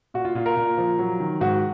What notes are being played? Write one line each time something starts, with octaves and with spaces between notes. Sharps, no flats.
A#2 F#4
F4
A#2 F4
A#4
A#2
F3
F#3
D#3
G#2 F#4